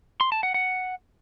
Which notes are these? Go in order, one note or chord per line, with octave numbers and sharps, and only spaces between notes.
C6
A5
F#5
F#5